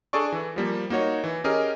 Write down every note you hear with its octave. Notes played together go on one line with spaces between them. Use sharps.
D4 G#4 A4 D5 C#6
E3
F3 G3 A#3
A#3 D#4 F#4 C#5
E3
C#4 G4 G#4 A#4 D#5